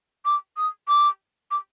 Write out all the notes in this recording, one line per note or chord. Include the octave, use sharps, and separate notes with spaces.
D6
D#6
D6
D6